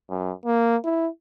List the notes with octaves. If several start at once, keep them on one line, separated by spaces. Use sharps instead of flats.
F#2
A#3
E4